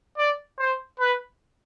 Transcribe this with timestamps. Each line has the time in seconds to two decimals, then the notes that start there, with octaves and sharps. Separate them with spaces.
0.18 D5
0.59 C5
1.00 B4